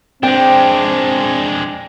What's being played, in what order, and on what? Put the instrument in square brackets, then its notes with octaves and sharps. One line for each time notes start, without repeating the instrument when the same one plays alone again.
[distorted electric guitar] G#3 D4 [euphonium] C4 [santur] G5